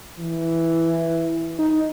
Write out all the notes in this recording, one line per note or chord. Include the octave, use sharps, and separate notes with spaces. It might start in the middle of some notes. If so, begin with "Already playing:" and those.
E3
D#4